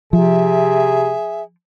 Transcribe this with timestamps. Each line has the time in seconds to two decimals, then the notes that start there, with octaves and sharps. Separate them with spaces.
0.13 C3 F3 G#4 E5